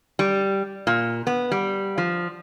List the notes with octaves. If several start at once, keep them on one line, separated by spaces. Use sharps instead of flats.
G3
A#2
B3
G3
F3